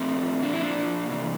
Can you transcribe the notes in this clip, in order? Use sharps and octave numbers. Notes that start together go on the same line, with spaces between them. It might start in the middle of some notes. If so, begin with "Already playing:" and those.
Already playing: A#2 F3 A3 C4
A#2 F3 D4
E4
A#3 D4
C3 E3